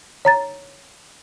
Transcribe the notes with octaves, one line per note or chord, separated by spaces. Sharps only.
C#5 A#5 A6